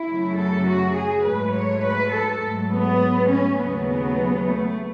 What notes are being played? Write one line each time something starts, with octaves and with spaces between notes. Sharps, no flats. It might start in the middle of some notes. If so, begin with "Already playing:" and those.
Already playing: E4
F#2 C#3 F#3 A3
A4
F#4
G#4
G#2 F#3 A3 B4
C#5
B4
A4
G#2 F#3 A3
B3
C#4
D#2 C#3 F#3 A3 B3
B3
A3